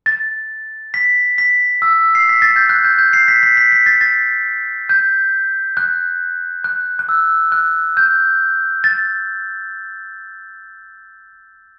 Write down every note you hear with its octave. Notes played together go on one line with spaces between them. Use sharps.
A6
B6
B6
E6
C7
B6
A6
G6
F#6
G6
G6
C7
B6
B6
B6
B6
A6
A6
G6
F#6
F#6
F#6
E6
F#6
G6
A6